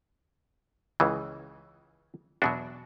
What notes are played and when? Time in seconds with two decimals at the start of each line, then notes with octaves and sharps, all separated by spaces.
1.00 C#2 C#3 E3
2.42 E2 B2 F#3 D4 F#4